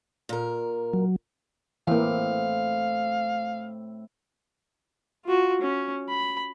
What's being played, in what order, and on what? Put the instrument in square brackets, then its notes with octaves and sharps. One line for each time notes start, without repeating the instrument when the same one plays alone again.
[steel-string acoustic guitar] A#2 A#4
[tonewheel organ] F#3
[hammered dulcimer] A2 C4 [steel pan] E3 A#3 [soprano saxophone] F5
[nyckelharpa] F4 F#4
C#4
B5